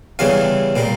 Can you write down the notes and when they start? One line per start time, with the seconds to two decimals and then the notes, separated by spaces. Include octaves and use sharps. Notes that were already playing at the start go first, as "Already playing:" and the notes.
0.19 E2 C#3 E3 G3 C#4 F5
0.76 A#2 G3 A#3